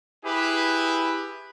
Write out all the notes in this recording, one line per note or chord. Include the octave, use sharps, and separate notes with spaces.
E4 G4 G#4 B4